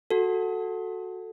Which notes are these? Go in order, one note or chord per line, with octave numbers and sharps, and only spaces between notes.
F#4 A4